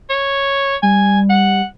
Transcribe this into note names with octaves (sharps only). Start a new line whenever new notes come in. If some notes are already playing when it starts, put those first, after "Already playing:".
C#5
G3 G#5
F#5